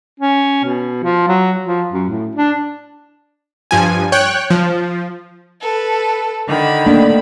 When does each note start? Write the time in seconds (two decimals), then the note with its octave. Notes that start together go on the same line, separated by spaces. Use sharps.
0.20 C#4
0.65 B2
1.04 F3
1.28 F#3
1.66 F3
1.92 F#2
2.10 A2
2.35 D4
3.71 G2 F3 G#5
4.12 C#5 G5 F#6
4.50 F3
5.61 A4 B4
6.48 D3 D#3 B5
6.87 A3 A#3 D4